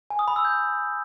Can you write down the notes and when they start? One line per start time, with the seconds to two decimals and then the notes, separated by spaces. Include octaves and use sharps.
0.10 G#5
0.19 D#6
0.28 B5
0.36 E6
0.45 G6